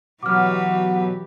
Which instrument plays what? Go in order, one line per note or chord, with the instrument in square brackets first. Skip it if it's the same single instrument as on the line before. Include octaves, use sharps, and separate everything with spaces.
[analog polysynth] B2 F#3 [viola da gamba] E3 G4 B4 [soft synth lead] F#5 [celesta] D6 F6